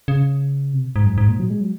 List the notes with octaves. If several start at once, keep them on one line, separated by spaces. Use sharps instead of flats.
C#3
C3
G#2
F#2
G#2
A#2
F#3
G#3
F#3